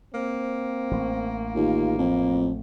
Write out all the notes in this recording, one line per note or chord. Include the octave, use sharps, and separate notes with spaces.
A#3 C4
A1
D#2 F4
F2 A2